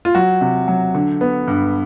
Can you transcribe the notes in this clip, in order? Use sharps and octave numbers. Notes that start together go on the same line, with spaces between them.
F4
F#3 F#4
C3
F#3
D3
B3
G2